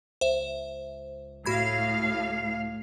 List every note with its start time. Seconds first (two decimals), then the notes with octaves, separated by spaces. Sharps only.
0.21 C#2 C5 E5
1.46 A2 F#4 F5 B5 G#6